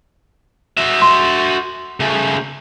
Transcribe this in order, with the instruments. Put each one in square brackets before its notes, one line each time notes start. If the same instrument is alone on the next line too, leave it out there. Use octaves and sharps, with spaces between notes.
[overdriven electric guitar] F#4 E5
[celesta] C6
[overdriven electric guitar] C#3 A3